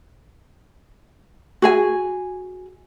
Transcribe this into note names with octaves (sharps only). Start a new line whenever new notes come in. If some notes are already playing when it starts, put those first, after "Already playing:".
F#4 G#4 G#5